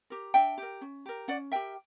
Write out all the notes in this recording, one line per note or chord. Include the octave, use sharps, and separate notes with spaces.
G4 A#4
D4 E5 G5
G4 A#4
C#4
G4 A#4
C#4 D5 F#5
G4 A#4 E5 G5